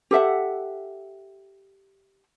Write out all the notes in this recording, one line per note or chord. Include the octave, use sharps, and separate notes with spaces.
G4 A4 E5 F#5